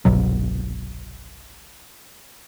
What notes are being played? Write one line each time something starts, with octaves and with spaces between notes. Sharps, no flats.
G1 C2 B2 F#3